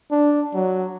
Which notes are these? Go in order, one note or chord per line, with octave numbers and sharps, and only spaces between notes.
D4
F#3